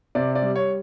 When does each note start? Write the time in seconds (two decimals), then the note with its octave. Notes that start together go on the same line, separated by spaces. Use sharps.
0.15 C3 D5
0.35 D5
0.42 G3
0.56 C#5